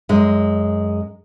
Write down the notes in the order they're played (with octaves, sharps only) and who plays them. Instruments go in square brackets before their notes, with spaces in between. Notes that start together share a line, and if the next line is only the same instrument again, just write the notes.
[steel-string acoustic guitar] F#2 G#3